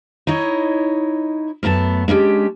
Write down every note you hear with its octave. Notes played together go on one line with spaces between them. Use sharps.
D#4 E4 C#5 D#5
F#2 A3 B3 F#4 A5
G#3 C#4 D4 G4